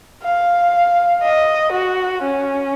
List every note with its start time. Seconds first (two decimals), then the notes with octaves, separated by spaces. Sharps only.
0.24 F5
1.23 D#5
1.73 F#4
2.23 C#4